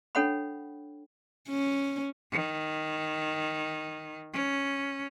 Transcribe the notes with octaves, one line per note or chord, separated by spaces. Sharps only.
D4 A4 C#5 F#5 G5 B5
C#4
D#3
C#4